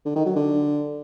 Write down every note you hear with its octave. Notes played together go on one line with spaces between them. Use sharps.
D3
D#3
F#3
D3